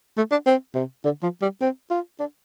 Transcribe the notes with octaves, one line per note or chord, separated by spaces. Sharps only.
A3
D4
C4
C3
D3
F3
G3
C4
F4
D4